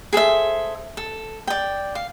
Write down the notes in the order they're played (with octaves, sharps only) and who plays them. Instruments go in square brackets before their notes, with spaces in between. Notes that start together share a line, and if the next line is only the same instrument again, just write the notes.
[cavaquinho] G#4 A4 C5 E5
A4
D5 G5
F5